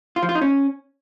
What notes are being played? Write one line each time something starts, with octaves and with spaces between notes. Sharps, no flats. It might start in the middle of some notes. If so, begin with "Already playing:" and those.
F4
F3
F4
D#4
C#4